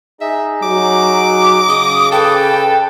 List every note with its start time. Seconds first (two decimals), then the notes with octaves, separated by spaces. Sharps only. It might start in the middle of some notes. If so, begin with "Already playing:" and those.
0.21 D#4 G#4 D#5 E5
0.62 F#3 D6
1.69 C#3 D#6
2.12 A4 B4 G5 A5